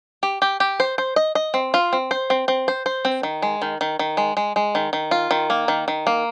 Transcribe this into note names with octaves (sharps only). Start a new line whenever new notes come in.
G4
G4
G4
C5
C5
D#5
D#5
C4
F4
C4
C5
C4
C4
C5
C5
C4
D#3
G#3
D#3
D#3
D#3
G#3
G#3
G#3
D#3
D#3
F4
D#3
A#3
D#3
D#3
A#3